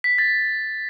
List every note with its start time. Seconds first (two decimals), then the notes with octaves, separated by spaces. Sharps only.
0.04 B6
0.18 A6